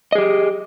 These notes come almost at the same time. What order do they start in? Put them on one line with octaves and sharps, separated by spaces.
D#5 G#4 G4